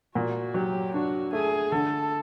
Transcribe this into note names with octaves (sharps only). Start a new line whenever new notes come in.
A#2 F#4
F#3 G4
D4 F#4
A3 G#4
D3 A4